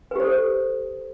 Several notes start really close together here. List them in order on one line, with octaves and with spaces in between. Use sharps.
B4 G4 C5 A4